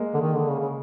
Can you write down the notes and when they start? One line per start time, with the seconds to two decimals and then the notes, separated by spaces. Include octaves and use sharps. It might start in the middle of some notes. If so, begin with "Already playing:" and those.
Already playing: G#3 A#3
0.14 D3
0.21 D#3
0.35 D3
0.49 C#3
0.59 C#3